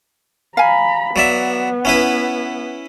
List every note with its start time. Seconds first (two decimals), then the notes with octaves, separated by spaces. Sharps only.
0.57 F5 G#5 A#5 B5
1.16 F#3 B3 D5 E5
1.85 C#4 E4 B4